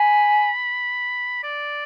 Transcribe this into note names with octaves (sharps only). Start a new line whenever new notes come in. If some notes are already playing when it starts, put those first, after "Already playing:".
Already playing: G#5 B5
D5